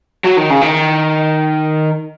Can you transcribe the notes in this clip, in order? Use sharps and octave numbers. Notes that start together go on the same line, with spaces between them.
F#3
D#3
C#3
D#3